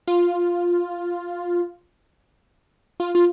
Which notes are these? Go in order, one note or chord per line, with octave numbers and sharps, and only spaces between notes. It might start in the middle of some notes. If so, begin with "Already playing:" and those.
F4
F4
F4